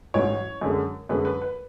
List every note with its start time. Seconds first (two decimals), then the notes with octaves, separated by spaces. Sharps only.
0.14 A1 G#2 F#3 C#4 C#5
0.61 F#2 D3 G#3
1.09 F#2 D3 G#3 B4
1.25 B4
1.42 B4